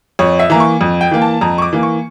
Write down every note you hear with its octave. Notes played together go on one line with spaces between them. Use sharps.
F2 C#5
E5
E3 A#3 A#5
C#6
F2
G5
E3 A#3
A5
F2 A#5
C#6
D6
E3 A#3
C#6